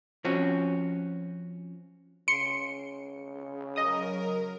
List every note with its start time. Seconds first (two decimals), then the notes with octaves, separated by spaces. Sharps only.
0.25 F3 C4 C#4 F#4
2.28 C#3 C6 C#7
3.76 F#3 A#4 D#5 D#6